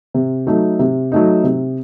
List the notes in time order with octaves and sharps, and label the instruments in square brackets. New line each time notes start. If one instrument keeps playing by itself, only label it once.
[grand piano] C3
F#3 A3 D#4
C3
F#3 A3 D#4
C3